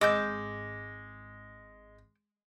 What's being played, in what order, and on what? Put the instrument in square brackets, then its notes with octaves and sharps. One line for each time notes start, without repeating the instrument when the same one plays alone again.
[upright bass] G#1 G#2 [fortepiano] G#3 [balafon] D#5 [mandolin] D6 E6 G6